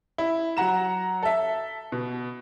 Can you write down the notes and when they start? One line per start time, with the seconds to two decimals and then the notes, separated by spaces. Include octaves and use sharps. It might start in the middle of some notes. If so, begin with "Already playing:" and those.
0.18 E4
0.57 F#3 F#5 A#5 E7
1.23 A4 E5
1.92 B2